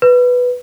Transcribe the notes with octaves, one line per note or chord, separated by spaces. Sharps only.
B4